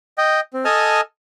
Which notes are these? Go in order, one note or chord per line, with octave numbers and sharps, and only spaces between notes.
D#5 G5
C4
A4 D#5 G#5 A5 D#6 F6